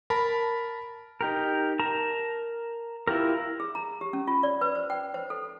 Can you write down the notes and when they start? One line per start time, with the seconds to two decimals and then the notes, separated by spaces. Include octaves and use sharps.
0.10 A#4 A5 B5
1.21 D#4 G4 A#4
1.80 A#4 A5 A#5
3.07 E4 F4 G4 A#4
3.60 G#4
3.75 A#5
4.01 G4
4.13 C#4
4.28 F4
4.43 D5
4.61 B4
4.75 C5
4.90 G5
5.14 C5
5.30 A4